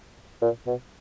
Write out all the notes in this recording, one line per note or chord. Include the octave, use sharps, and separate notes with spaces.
A#2
B2